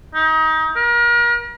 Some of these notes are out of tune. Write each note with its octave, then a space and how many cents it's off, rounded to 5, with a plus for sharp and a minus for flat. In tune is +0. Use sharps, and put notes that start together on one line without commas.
D#4 +30
A#4 +35